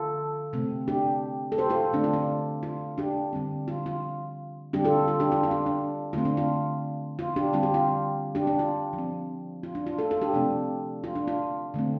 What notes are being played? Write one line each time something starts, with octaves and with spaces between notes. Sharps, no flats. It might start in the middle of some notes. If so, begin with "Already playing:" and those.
Already playing: D3 F4 A4
C3 A3 C4
D4 G4
A4
G4 C5
F4 A4
D3 A3 C4 D4
F4
D4
F4
D4 G4
D3 G3 C4
F4
F4
D3 G3 C4 D4 G4
F4 A4
F4
D4 G4
F4
F4
D4
D4
D3 A3 C4 F4
D4
F4
F4
D4 G4
D3 G3 C4 F4
G4
F4
D4 G4
D4
F4
F3
C4
F4
D4
F4
F4 A4
F4 A4
D4 G4
C3 F3 A3 C4 D4
F4
D4
F4
D3 A3 C4